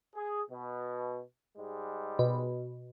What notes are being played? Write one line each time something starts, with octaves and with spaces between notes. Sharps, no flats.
G#4
B2
G#2 G3 G#3
B2